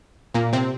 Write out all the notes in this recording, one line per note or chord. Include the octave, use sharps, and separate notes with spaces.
A#2 A#3
C3 C4